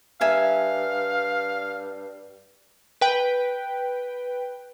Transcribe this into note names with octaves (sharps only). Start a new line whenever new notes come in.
G2 E5 F5 G#5 A#5
B4 G5